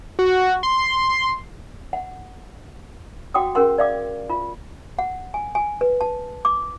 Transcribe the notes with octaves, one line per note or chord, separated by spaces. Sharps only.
F#4
C6
F#5
F#4 F#5 G5 D6 D#6
C#4 G#4 A#4 F#5 C6
D5 F5 D6
F4
F#5
G#5
G#5
B4
A5
D6